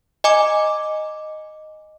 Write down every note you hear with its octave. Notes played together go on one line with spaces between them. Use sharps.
D#5 G#5 A#5 D6